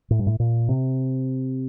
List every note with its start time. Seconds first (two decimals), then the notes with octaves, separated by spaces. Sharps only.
0.11 A2
0.19 G2
0.27 A2
0.40 A#2
0.69 C3